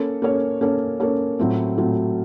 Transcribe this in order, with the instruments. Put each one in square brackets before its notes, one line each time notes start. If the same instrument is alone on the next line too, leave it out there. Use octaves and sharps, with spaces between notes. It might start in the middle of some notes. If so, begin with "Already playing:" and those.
Already playing: [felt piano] A#3 C#4 A4 C#5
A#3 C#4 A4 C#5
A#3 C#4 A4 C#5
A#3 C#4 A4 C#5
A2 F#3 A3 C4 F4
A2 F#3 A3 C4 F4